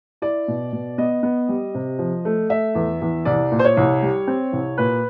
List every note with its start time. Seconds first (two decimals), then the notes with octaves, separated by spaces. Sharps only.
0.22 E4 D5
0.48 B2
0.72 B2
0.98 B3 D#5
1.23 B3
1.49 G3
1.74 C3
1.99 F3
2.25 A3
2.50 A3 E5
2.75 E2
3.01 E2
3.25 C2 D5
3.52 A#2
3.59 C5
3.64 C#5
3.77 C2
4.02 G3
4.28 C4
4.53 C2
4.78 A#2 B4